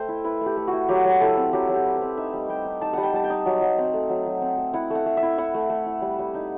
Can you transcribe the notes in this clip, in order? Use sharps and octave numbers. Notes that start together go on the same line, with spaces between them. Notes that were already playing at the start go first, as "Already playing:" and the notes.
Already playing: A3 C5 G5
E4
E4 B4
A3
G4
A3
F#4
E4
F#3 G4
F#3
E4 A4
C4
F#3 G4
F#3
G4
E4
B4
C4
D#4 E5
G3
G3 G5
D#4
D#4 A5
G3 F#5
G5
G3 A5
G5
D#4
F#3
F#3
C4
A3
F#3
F#3
C4
A3
E4 F#5
A3 F#5
A3
E5
E4
E4 F#5
A3
A3
E4
G3
G3
D#4